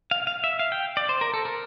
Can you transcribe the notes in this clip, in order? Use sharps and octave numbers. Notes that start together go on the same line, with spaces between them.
F5
F5
E5
F5
G5
D5
C5
A#4
A4
A#4